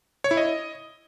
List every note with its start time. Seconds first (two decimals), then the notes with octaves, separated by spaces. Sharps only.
0.24 C#5
0.31 E4
0.37 D#5